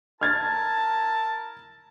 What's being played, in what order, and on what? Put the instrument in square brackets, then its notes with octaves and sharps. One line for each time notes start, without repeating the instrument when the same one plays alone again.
[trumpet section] E4 A#4 A5 [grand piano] F6 G#6 A6